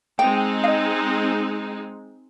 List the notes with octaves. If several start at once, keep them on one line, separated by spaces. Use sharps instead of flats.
G#3 C4 D#4 G5
F5
D#5